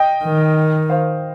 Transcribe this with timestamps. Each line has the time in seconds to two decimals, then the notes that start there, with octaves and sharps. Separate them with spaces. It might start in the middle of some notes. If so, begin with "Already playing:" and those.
Already playing: D#5 G5
0.24 D#3
0.90 C5 F5